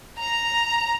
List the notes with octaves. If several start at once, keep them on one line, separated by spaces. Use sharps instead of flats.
A#5